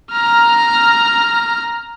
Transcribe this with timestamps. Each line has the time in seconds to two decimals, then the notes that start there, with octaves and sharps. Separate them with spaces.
0.12 A#5 F6